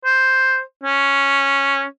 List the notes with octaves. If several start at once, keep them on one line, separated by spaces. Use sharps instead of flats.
C5
C#4